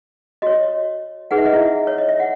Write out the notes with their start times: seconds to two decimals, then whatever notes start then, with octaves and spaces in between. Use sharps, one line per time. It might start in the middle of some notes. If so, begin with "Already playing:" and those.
0.42 F#4 C#5 D#5
1.31 D#4 G#4 B4 F#5
1.38 E5
1.46 D#5
1.53 E4 E5
1.87 C#5
1.98 D#5
2.09 E5
2.20 F#5